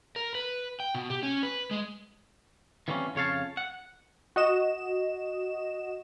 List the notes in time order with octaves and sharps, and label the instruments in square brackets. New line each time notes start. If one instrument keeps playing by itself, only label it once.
[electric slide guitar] A#4
B4
G5
B2
G4
C#4
B4
G#3
[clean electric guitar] E3 G3 A#3 C4 C#4
F2 C#3 C#5 F5 A5
F#5
[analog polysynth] F#4 D#5 E7